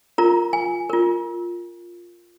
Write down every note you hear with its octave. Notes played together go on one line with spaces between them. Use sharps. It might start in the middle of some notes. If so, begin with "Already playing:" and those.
F4 A#4 A#5
G#5
F4 A#4